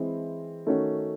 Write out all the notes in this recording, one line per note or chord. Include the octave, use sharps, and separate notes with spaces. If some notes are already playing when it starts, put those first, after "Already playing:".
Already playing: E3 G#3 C4 E4
D#3 A3 C#4 F#4